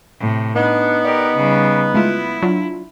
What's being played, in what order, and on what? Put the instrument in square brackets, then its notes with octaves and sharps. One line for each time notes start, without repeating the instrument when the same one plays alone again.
[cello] A2 C3
[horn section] B3 [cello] D4 [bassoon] D#4
[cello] G4 A#4 [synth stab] D5 D#5
[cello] C#3 G3
[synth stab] G#3 A3 F4 [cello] E4
[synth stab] F#3 D4 F4